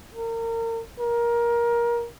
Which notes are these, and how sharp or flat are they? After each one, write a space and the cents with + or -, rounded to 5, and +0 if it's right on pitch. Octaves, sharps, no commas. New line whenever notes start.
A#4 -30
A#4 +20